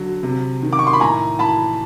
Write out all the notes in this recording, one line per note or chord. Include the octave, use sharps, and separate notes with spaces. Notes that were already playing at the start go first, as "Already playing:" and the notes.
Already playing: D3 F#3
C3
D#3
D6
C#6
C6
B5
A2 G#5 A#5
E3 A5 B5